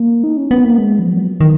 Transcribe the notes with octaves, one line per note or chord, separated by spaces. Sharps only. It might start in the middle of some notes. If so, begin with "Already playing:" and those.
Already playing: A#3
D#4
C#4
B3
A#3
G#3
F3
F#3
D#3